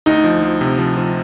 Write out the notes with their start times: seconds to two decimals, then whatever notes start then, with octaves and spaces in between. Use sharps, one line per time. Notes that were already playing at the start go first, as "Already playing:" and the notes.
0.06 D2 D#4
0.24 F3
0.43 F3
0.61 C3
0.79 F3
0.97 F3